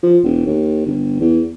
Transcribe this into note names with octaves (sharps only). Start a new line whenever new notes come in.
F3
E1
D#2
G1
E2